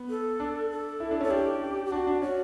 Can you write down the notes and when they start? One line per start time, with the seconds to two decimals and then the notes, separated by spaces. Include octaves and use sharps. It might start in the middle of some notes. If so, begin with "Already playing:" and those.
Already playing: B3
0.10 A4
0.40 D4
0.70 A4
1.00 E4
1.11 D4
1.21 C#4 A4
1.31 D4 G4
1.86 G4
1.91 D4 F#4
2.07 D4
2.22 C#4 F#4